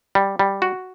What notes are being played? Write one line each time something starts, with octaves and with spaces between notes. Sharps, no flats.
G3
G3
F#4